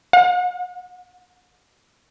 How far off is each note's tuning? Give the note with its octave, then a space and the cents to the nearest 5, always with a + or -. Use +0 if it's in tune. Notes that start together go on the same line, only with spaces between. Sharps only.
F#5 -40